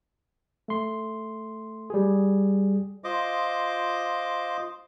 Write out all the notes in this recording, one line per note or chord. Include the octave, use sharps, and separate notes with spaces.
A3 C6
G3 G#4
F4 C5 D#5 D6